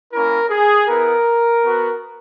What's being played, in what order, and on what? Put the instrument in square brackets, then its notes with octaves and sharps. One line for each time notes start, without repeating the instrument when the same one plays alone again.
[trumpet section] A#3 C#4 E4 A#4
G#4
B3 E4 A#4
B3 F#4